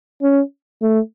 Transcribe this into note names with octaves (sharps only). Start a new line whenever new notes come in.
C#4
A3